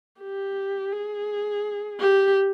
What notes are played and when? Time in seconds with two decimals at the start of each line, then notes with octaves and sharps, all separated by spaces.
0.21 G4
0.93 G#4
2.00 G4